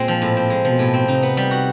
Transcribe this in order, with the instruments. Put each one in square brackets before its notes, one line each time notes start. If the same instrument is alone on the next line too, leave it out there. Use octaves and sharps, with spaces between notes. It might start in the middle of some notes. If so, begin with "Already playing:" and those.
Already playing: [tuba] A#2 [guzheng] G#3 C4
[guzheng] F3
A2
C4
G#3
[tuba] B2 [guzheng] F3
[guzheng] A2
C4
[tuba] C3 [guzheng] D#4
[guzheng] B3
G3
F#4